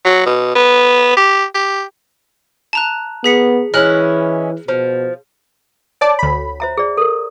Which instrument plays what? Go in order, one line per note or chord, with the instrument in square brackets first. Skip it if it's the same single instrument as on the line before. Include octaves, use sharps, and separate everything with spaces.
[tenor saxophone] F#3
B2
B3
G4
G4
[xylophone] A5 A#5 F#6
[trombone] B3 [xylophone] G#4 B6 C#7
[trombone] E3 [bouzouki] G#3 C#4 E4 [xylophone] F6 F#6 F#7
[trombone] B2 [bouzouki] F3
[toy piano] C#5 [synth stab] D5 A5 D6
[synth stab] D2 B5
[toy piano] C5 E5 A#5
G#4 D5
A4 A#4